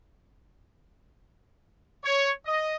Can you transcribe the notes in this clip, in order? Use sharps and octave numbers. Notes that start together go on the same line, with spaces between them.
C#5
D#5